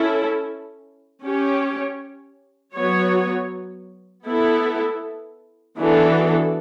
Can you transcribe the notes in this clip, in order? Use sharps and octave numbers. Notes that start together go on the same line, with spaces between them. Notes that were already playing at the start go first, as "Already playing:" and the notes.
Already playing: C#4 E4 A4
C#4 G4 C#5
F#3 B3 F#4 C#5
B3 E4 A4
E3 B3 D4 F#4 A4